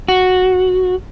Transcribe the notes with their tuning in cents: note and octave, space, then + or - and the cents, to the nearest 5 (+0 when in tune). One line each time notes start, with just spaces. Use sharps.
F#4 -5